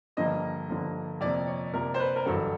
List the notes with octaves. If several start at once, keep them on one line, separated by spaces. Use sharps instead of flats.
G2 D3 F3 A#3 D#5
G2 D3 F3 A#3
F2 C3 F3 A#3 D5
C#5
F2 C3 F3 A#3 A#4
C5
B4
A#4
A1 G2 D3 F#3 A4